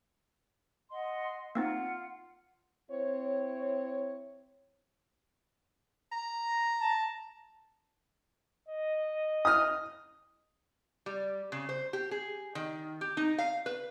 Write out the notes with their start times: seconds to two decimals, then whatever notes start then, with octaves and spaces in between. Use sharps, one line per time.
0.90 D#5 F#5 C6
1.55 A#3 C4 D#4 F4 F#5
2.91 C4 E4 C#5
6.12 A#5
6.81 A5
8.68 D#5
9.45 D#6 F6
11.06 G3
11.52 C#3
11.69 C5
11.93 G4
12.11 G#4
12.55 D#3
13.01 G4
13.17 D#4
13.38 F5
13.66 B4